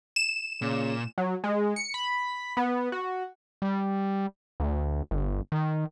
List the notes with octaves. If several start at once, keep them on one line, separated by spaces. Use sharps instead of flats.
E7
A#2 C#3
F#3
G#3
C#7
B5
B3
F#4
G3
D2
G1
D#3